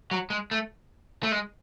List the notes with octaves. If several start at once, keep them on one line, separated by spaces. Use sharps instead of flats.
F#3
G#3
A3
A3
G#3